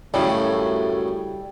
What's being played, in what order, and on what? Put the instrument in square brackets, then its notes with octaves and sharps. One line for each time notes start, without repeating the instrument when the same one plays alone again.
[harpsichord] F#2 A2 C#3 [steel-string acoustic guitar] G3 [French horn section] A3